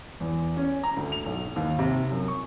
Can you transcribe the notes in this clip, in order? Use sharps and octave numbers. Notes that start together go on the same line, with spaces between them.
E2
C#4
A#5
D2
F7
B1
D#2
C3
F#2
C#6